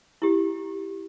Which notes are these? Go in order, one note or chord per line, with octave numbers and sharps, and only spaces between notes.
E4 G4